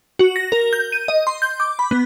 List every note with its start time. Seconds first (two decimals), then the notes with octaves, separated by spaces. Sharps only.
0.19 F#4
0.36 A#6
0.52 A#4
0.73 G6
0.92 D#7
1.08 D#5
1.27 C6
1.42 G6
1.60 D6
1.79 B5
1.91 B3